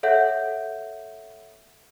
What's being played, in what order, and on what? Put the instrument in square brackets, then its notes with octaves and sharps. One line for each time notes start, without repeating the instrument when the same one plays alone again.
[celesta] A4 C#5 E5 F#5 G6